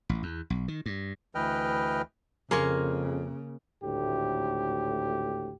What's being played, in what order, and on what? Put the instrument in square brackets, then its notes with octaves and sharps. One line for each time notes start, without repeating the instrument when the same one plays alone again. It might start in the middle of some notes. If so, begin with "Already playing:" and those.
[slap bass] A1
E2
B1
D#3
G2
[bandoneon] D2 E3 B4 D#5 G5 F6
[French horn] F2 [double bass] C#3 [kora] A#3 A#4 [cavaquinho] G#4 C6 C#6
[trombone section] G#1 D2 A2 G4